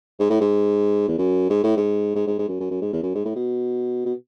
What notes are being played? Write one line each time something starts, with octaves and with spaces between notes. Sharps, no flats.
G#2
A2
G#2
E2
F#2
G#2
A2
G#2
G#2
G#2
G#2
F#2
F#2
F#2
G#2
E2
F#2
G#2
A2
B2
B2